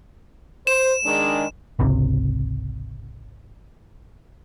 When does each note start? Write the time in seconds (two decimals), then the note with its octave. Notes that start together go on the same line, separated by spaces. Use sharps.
0.67 C5 E7
1.05 D#3 G#3 D4
1.79 G#1 C#2 C3